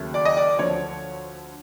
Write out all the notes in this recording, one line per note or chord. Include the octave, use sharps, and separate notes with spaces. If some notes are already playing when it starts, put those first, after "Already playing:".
Already playing: D#2 C#3 F#3 A3
D5
D#5
D5
D2 D3 F3 C#5